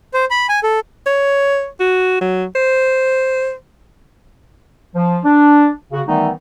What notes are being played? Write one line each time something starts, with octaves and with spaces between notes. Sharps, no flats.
C5
B5
G#5
A4
C#5
F#4
F#3
C5
F3
D4
C#3 F#4
D#3 E3 G3 A3 B3 D#4